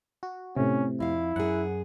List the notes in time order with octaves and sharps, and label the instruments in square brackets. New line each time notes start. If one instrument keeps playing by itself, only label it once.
[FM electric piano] F#4
[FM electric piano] A2 C3 [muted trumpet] C#4
[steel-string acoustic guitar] F2 F5 [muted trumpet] E4
[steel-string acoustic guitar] F#2 G#4 [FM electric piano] F#5